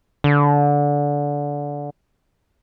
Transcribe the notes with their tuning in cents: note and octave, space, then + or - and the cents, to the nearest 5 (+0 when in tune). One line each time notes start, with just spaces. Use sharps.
D3 -20